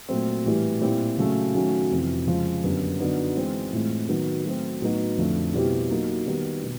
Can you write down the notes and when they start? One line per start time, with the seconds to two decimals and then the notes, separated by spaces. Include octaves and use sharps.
0.09 A#2 F#3 A3 C4
0.45 A2 E3 G3
0.81 A#2 G3 C4 E4 G4
1.18 C#3 F#3 A3 C#4
1.55 D#3 F#3 A3 C#4
1.91 F2 C3 E3
2.27 C#3 F3 G#3
2.64 F#2 D3 G3 B3
2.99 D3 F#3 B3 D#4
3.36 E3 G#3 C4
3.72 A2 E3 G#3 C4 F4
4.09 D#3 F#3 B3
4.45 F#3 A3 C4
4.82 A2 F#3 B3 D#4 F#4
5.17 F2 D3 F3 A3
5.54 B2 G3 C4 E4 G4
5.90 F#3 A#3 D#4
6.27 D#3 G3 B3
6.64 B2